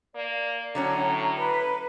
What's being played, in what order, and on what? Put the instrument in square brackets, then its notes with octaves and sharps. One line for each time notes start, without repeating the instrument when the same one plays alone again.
[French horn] A#3 [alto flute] D5
[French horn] A2 [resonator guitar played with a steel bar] D3 F#3 C#4 [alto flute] A#5
[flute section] B4